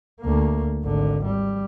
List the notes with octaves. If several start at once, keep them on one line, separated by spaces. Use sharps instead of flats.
D2 A#3
G#1 D3
G3